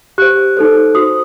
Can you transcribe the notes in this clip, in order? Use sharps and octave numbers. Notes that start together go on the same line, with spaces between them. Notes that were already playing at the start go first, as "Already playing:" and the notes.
G4 C5 F#6
D#4 A4 C5
F#4 C5 D#6